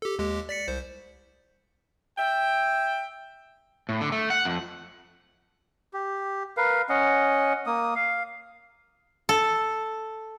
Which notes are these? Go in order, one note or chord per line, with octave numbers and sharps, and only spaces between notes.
G4 A4
D#2 G#3 G4
D5 B6 C#7
C2 C5
E5 G5
A2
D3
A3
F#5
F2
G4
A#4 B4 F5
C#4 D#5 F#5
A#3 D#6
F5
A4